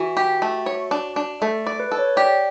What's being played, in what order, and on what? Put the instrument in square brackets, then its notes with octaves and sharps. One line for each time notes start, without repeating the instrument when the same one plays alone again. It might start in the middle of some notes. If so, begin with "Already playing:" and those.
Already playing: [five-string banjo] E3 [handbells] F#4
[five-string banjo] G4
A3
C#5
D4
D4
[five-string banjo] A3 [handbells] A4
[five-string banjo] D5
[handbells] B4
[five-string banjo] A4
[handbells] C#5
[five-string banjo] G4 [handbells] D5